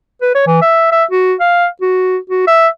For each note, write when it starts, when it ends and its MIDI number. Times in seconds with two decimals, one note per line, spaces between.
0.21 0.33 71
0.35 0.43 73
0.47 0.61 52
0.62 0.88 76
0.92 1.04 76
1.11 1.34 66
1.40 1.66 77
1.81 2.17 66
2.30 2.43 66
2.47 2.68 76